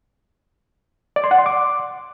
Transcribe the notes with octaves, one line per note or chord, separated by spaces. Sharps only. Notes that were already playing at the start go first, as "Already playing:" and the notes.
D5
C6
F#5
C6
D6